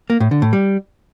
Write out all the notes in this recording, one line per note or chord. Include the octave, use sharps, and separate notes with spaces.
A#3
A2
D3
A2
G3